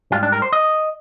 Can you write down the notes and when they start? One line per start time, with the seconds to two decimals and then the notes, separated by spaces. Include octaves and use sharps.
0.12 G#2 G3 F4
0.23 D4
0.32 A#4
0.42 C5
0.53 D#5